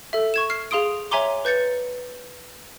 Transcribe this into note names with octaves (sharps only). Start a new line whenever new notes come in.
A4 E5
C#6 G#6 E7
F6 C7
G#4 F5 C6 D#6 D7
C#5 E5 G#5 A#5 C6 D6
B4 G6 A6 C#7